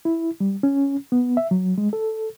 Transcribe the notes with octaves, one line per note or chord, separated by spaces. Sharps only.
E4
G3
C#4
B3
E5
F#3
G#3
A4